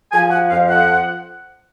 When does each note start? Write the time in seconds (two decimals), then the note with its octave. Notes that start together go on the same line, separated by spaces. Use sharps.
0.12 F3 G#5
0.30 F#5
0.49 F2 F5
0.68 F#5